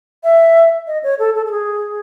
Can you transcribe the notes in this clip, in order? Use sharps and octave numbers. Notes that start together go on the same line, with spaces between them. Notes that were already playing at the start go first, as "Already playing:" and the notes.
E5
D#5
C#5
A4
A4
A4
G#4